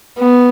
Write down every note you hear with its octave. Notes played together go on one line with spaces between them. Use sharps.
B3